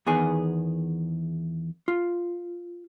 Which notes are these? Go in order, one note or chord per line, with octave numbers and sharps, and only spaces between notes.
E2 D#3 B3 G#4 G#5
F4